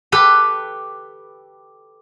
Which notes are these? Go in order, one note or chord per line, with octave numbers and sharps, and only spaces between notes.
G4 A4 B4